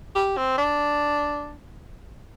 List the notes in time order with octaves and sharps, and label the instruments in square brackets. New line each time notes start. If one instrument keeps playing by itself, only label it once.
[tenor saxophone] G4
C4
D4